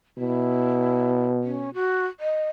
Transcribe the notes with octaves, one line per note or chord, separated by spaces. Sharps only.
B2 E4
C#4
F#4
D#5